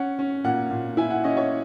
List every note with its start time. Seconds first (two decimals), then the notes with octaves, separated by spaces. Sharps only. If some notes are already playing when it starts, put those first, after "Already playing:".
Already playing: C#4 F#5
0.19 C#4
0.44 A#2 F#5
0.71 A#2
0.97 E4 G#5
1.10 F#5
1.24 C#4 D#5
1.37 C#5